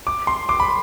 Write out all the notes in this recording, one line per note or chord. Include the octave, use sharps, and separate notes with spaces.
D6
C6
D6
B5